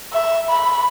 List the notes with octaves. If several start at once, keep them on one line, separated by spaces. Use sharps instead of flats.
E5
B5